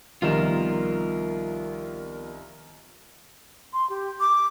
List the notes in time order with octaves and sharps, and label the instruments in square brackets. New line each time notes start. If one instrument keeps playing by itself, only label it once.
[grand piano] C2 D#3 E7 [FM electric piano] F3 B3 [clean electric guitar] F4 A#4
[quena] C6
G4
D6